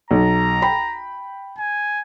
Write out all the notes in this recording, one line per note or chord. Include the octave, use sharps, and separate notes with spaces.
B1 A#5
G5 B5
G#5